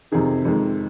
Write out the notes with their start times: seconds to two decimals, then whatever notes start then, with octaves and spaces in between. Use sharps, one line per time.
0.12 F2 C3 D#3 G#4
0.45 F2 D#3 G#3